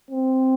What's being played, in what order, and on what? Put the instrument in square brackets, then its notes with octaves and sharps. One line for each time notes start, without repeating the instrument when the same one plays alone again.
[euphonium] C4